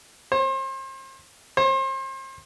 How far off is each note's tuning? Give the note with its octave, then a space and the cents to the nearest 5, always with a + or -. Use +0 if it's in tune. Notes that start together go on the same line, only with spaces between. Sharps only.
C5 +35
C5 +35